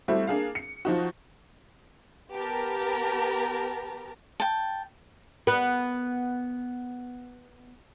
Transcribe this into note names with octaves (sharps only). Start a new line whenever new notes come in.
G3 A3 C4 E4 F#4
A#3 D4 G#4 F5
C#7
F3 D#4 F#4
B3 G4 A#4 A5 A#5
G5 A5
B3 B4